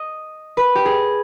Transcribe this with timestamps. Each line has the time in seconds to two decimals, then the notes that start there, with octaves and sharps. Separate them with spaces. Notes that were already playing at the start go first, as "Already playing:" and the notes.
Already playing: D#5
0.57 B4
0.75 G4
0.85 G#4